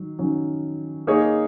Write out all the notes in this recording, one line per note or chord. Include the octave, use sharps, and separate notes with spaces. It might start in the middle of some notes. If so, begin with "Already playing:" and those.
Already playing: D#3 F#3
D#3 F#3 C#4
A#3 D#4 G#4 C#5